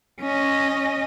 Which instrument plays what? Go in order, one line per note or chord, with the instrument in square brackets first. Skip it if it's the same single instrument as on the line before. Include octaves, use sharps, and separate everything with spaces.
[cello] C#4 D#5